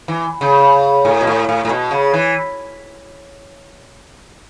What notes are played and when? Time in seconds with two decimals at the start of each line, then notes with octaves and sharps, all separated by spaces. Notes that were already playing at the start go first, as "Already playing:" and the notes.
0.08 E3
0.41 C#3
1.05 A2
1.21 B2
1.27 A2
1.49 A2
1.65 A2
1.69 B2
1.91 C#3
2.14 E3